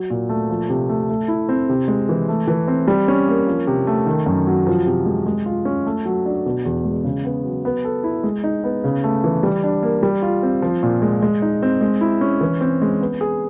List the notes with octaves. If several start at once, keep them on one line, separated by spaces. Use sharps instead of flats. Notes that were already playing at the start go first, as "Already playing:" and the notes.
Already playing: F#3
A#2
A3
F3
C3
A3
A3
E4
C4
C3
G#3
E3
A3
E3
C4
G3
C#4
A#3
F3
C3
A3
D#3
F#2
F#3
F3
C3
G#3
G#3
F4
C#4
A3
F#3
D4
B2
E2
G#3
C#3
B3
F#3
B3
A4
E4
G#3
D#4
B3
C#3
A3
E3
G3
D4
A#3
G3
F4
C4
F3
A#2
G#3
G#3
D#4
C4
G#3
E4
C#4
E3
C4
G#3
B3
G#4